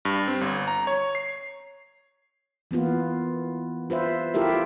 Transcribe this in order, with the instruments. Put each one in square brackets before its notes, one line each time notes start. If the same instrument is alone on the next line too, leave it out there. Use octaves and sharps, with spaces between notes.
[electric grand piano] G2
C4
G1
A#5
C#5
C7
[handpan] E3 A#3 B3 F4
F4 B4 C5 E5
E4 F4 G4 A4 A#4 E5